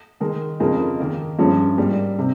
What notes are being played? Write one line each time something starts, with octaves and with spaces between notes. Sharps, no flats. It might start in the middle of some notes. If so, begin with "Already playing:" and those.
D#3 G#3 D#4 A#4
F2 C#3 G#3 D#4 A#4
D#3 A#3 D#4
G2 F3 G#3 C#4
G#2 G3 A#3
C3